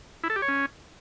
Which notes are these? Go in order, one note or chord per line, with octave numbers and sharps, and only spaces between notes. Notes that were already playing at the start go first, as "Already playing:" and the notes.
E4
A4
G4
C#5
C#4